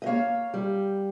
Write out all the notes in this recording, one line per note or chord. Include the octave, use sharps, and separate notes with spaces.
D#5
A#3 C#5 F5
G3